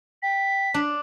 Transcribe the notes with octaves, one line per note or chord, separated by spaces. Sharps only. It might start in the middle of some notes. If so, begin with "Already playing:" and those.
G5 B6
D4